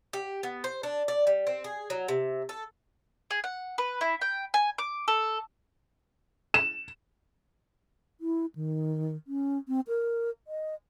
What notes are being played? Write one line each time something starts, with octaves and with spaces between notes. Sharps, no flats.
G4
B3
C5
D4
D5
G3
C4
G#4
F#3
C3
A4
G#4
F#5
B4
E4
G5
G#5
D6
A4
E7
E4
D#3
C#4
C4
A#4
D#5